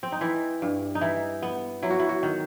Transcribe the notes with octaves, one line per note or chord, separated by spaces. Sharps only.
C4
D#4
E3 E4
G2
D#4
E3 E4
B3
F#3 E4
F#4
E4
F#4
D#3